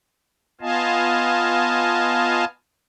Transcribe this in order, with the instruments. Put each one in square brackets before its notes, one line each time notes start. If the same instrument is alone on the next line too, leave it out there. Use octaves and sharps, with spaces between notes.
[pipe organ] B3 F4 D#5 F5 G#5 A5